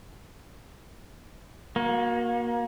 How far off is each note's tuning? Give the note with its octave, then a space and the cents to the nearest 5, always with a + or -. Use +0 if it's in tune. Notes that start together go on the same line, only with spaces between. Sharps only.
A#3 +25 F#4 -20